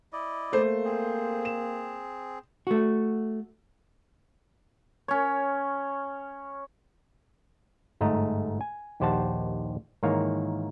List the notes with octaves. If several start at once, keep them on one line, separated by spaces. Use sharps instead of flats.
E4 D5 D#5
A3 A#3 C5
C4 G#4
E7
A3 F#4
C#4 C#5
G1 G#2 A3 D#5 A#5
G#5
A#1 D#2 G4 C5 F#5 A5
G#2 D#3 E3 A#3 C#5 F5